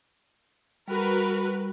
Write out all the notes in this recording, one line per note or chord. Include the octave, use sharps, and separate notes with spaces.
G3 F#4 A#4 B4